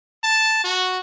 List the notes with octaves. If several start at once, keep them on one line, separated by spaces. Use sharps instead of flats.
A5
F#4